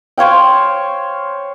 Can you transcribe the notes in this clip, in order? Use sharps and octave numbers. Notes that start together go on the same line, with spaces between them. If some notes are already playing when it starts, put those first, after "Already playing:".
C5 C#5 F5 G5